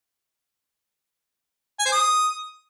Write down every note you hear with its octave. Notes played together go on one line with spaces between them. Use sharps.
G#5
C5
D#6